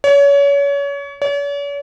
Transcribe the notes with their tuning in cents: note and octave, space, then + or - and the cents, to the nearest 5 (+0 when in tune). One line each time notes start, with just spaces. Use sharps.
C#5 +30
C#5 +45